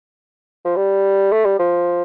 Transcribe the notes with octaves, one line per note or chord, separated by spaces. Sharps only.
F3
G3
A3
G3
F3